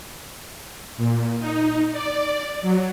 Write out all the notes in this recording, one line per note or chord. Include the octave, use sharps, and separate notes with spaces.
A#2
D#4
D5
F#3